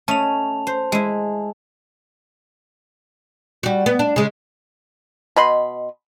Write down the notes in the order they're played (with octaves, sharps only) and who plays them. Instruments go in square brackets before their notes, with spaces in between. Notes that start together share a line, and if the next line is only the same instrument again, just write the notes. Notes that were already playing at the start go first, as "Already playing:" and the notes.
[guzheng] A3 C#4 D#5 [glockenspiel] A5 F7
[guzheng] C5
G#3 E4
[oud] G3 F#4
B3
D4
C#3 G#3
[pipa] B2 D#5 B5 C6